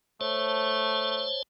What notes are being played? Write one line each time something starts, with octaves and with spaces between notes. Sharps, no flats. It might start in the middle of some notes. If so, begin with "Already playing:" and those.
A3 C5 C#5 A5